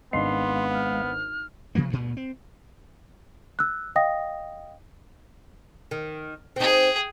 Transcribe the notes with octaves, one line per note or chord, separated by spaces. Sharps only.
G#1 G#3 B3 D4 F5 C6
F6
C3 F3 A#3 B3
D2 G2 A#2
C4
E6 F#6
D#5 F5 G5 D#6 A#6
D#3
C4 D#4 G#4 G5